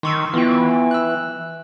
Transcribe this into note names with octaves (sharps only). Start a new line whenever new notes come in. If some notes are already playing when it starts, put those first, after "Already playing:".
D#3 C6 C#6 E6
E3 B3 F4 G5
E6 F#6